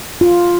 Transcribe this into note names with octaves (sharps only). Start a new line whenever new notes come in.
F4